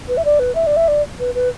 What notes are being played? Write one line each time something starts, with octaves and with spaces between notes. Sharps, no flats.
B4
E5
D5
B4
E5
D5
E5
D5
B4
B4